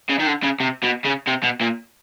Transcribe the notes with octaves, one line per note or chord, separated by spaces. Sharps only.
C#3
D#3
D3
C#3
C3
B2
C#3
C3
B2
A#2